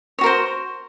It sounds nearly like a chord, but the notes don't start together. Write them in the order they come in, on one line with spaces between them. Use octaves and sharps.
C#5 F#4 A#4 C5